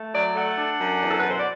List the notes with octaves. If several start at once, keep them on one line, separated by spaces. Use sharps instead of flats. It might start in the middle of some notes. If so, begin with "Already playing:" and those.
Already playing: A3
F#3 D5
A3 F#5
D4
F#2
E2
A4
B4
B2 C5
D5